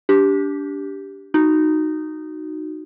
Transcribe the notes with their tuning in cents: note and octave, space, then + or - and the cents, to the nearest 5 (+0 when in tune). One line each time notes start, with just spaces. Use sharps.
D4 -25 G4 +0
D#4 -10 F#4 +0